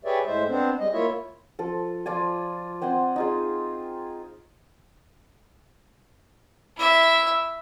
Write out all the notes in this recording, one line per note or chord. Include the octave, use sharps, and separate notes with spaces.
G4 G#4 B4 C#5 D5 E5
A2 G#3 C5 E5
B3 C4 D4 C5
G3 G#3 D#5
A#3 E4 F4 C#5 E5
F3 A4
F3 F4 D5 G#5
C4 F#5 G#5 C6
D#4 F4 G#4
E4 E5